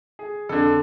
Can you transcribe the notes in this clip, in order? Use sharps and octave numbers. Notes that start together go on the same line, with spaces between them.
G#4
F2 D3 A4